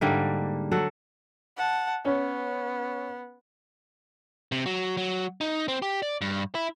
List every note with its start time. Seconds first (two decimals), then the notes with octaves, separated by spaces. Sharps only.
0.01 G#2 D3 G3 A#3
0.71 F#3 A4 F#5
1.57 F#5 A5
2.05 B3 C#4
4.52 C3
4.66 F#3
4.97 F#3
5.41 D#4
5.68 C4
5.82 G4
6.03 D5
6.21 G2
6.55 E4